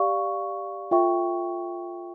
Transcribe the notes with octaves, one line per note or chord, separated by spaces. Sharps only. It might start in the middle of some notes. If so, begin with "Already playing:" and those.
Already playing: G4 D5 F5 C#6
F4 A4 E5 G5 C#6